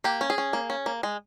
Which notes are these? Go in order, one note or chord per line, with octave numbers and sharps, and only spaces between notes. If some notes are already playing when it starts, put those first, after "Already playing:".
A#3 G4
C#4
G#4
C#4
A#3
C#4
A#3
G#3